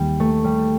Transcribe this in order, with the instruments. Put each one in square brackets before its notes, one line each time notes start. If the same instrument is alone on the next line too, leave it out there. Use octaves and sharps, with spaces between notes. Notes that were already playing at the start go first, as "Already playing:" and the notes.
Already playing: [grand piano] D#2 [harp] G3
[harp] A3
G3